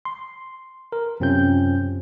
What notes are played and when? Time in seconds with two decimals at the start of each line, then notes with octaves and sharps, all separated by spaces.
0.05 C6
0.92 A#4
1.20 F#2 C3 C4 C#4 F4 G6